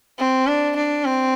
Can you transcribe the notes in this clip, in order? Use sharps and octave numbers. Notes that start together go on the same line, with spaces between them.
C4
D4
D4
C4